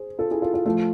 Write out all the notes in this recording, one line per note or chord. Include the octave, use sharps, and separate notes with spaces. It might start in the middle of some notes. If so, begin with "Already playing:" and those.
Already playing: G#4 C5
F4 A4
E4 G#4
F4 A4
F4
F3 A3 F4